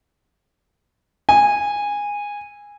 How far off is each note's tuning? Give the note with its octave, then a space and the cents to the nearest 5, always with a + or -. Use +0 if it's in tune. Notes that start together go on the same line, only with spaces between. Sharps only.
G#5 -15